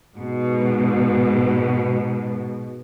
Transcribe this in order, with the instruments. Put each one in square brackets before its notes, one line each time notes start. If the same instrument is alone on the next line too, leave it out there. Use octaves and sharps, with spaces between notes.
[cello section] G#2 B2